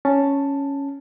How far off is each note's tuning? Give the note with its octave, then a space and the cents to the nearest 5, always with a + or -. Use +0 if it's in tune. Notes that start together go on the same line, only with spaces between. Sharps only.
C#4 +0 A5 +5